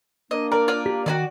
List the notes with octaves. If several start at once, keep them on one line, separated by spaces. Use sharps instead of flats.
A#3 D4 D#5
A#4 D5
F4 D5
G4
D#3 F#4 G#4 D5 F#5 G5